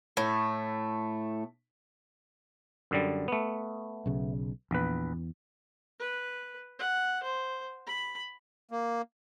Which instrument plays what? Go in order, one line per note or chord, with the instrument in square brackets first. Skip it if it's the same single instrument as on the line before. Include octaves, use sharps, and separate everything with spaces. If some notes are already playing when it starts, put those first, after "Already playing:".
[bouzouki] A2 A3
[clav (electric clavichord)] F#2 D3 G3
A3 B3
[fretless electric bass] B1 C#3
[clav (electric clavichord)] A#1 B4 [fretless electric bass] E2
[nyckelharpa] B4
F#5
C5
B5
[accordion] A#3